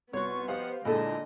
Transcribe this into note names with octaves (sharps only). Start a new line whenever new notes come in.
C2 B3 F4 F#4 C#5 C6 C#6
F3 G4 C5 D#5 F5 F#5
A#2 D3 G#3 E4 A4 D#5